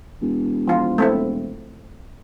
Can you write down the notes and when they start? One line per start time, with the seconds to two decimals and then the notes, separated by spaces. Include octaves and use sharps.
0.21 E1
0.67 F3 F4
0.98 A3 C4 E4